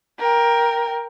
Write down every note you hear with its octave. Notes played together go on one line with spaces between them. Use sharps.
A#4 G5